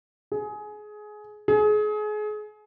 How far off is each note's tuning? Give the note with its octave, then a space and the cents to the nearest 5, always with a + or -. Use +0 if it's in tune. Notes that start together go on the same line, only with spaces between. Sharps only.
G#4 +20
G#4 +30